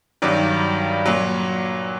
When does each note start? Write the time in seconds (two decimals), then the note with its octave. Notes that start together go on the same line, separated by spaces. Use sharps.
0.22 G2 D#3 F#3 D5
1.06 A#2 F#3